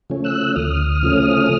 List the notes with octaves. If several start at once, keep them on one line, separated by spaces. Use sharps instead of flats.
C#3 F3 A3 C#4
E6 F#6
D2 D#6 F6
C#3 F3 A3 C#4